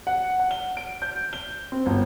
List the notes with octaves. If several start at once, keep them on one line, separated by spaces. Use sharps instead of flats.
F#5
F#5
G7
D7
G6
G7
C4
G1